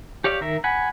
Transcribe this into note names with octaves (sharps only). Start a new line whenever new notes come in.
G4 C#5 D5 F5
D#3 A#4 E5
F#5 G#5 B5